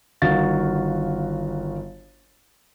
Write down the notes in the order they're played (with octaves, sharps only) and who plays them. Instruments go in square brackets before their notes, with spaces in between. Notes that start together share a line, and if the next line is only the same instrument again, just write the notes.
[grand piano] G1 D#3 F#4 F5 A6